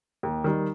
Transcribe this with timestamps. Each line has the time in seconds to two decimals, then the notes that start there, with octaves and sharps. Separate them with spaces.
0.23 D#2
0.44 D#3 G3